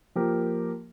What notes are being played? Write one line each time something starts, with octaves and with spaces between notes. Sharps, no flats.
F3 A#3 G4 A#4